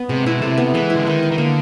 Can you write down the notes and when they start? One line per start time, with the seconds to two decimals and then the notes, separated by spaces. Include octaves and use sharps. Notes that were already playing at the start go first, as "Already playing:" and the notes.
Already playing: B3
0.09 C3 G#3
0.26 B2 E4
0.41 C3 A4
0.58 B3
0.74 E3 G#3
0.90 E4
0.96 D3
1.06 D#3 B4
1.23 D#4
1.32 D#3
1.38 D3 A#3